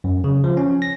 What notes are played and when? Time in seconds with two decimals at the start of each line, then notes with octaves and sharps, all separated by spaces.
0.04 F#2
0.24 C#3
0.44 F3
0.57 C#4
0.82 A#6